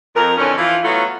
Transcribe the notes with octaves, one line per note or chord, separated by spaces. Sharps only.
F2 A#4
F2 D3 E3 C#4
E3 F3 F4
F#3 A3 B3 C#4 E4 F4